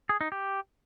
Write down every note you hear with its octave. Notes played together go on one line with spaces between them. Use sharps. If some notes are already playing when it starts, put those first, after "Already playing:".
G#4
D#4
G4